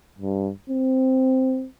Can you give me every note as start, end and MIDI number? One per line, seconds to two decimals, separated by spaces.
0.19 0.51 43
0.70 1.67 60